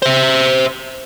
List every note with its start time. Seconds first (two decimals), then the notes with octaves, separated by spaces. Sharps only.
0.02 C5 E5